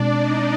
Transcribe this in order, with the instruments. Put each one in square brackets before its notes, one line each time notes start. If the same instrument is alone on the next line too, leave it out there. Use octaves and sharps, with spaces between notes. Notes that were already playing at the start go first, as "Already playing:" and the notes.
Already playing: [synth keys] B2 G#3 C4 [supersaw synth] D4 D5
[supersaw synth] D#4 D#5